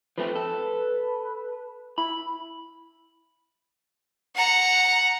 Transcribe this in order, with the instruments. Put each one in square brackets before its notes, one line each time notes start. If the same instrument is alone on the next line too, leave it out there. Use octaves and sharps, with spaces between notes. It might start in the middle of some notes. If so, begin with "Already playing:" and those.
[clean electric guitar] F3 A3 C4 [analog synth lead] B4
[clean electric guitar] A4
[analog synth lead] E4 [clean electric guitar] B5
[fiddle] F#5 A#5